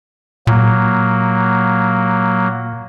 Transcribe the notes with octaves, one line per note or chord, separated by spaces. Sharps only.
A#2 F#3 A#3